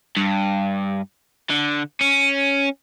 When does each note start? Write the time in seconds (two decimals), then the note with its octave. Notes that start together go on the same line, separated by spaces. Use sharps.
0.17 G2
1.50 D3
2.01 C#4